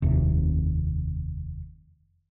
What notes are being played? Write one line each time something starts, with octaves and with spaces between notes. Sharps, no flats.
F1 D#2 C3